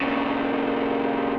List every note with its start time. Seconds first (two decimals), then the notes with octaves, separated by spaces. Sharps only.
0.01 A#2 C#3